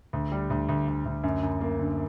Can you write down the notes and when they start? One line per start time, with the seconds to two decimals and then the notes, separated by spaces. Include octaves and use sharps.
0.13 D2
0.32 G3
0.50 D2
0.69 D2
0.88 D2
1.05 D2
1.24 F#2
1.43 F#2
1.61 A#3
1.79 D3